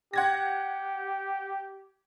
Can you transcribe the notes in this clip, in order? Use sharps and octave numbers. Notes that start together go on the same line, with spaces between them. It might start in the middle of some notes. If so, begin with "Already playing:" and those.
G4 F#5 G#6 A#6